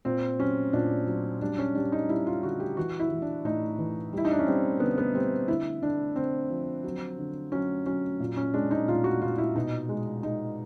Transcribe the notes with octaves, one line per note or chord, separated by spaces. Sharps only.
A#2 C4
F#3 C#4
A#2 D4
F#3
G3 D4
C#4
G3 D4
D#4
G3 E4
F4
D3 F#4
G4
E3 F#4
E4
E3
D4
A2 D#4
E3
G3 E4
D#4
D4
C#4
G3 C4
D3 B3
B3
G3 C4
D3 E4
D3 D4
D3 C4
F3
F#3
D3
F#3 C#4
F#3 C#4
A#2
C#4
G#3 D4
D#4
A#2 F4
F#4
A#2 F4
E4
B2 D#4
G#3
G#3 D#4